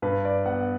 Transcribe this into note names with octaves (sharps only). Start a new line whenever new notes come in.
G2 B4
D5
B3 F#5